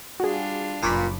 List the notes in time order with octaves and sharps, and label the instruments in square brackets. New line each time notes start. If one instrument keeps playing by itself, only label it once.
[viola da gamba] G3 D4 F4 [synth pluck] F#4 G#4
[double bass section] F#1 [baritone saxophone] A#2 [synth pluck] B5 C#6 D6